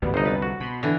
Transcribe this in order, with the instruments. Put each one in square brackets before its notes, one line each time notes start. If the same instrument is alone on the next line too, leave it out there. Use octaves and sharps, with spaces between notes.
[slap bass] A1 D2 G#2 [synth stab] B2 G3 B3
[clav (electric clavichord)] G1 D#4 [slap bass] C2 D3 [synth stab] C5 D#5
[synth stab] F2 B4 A6
[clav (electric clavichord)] F#4
[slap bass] B2 [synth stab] B5 C6
[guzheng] D3 E3